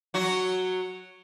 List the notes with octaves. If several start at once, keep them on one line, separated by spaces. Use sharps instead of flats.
F#3 F#4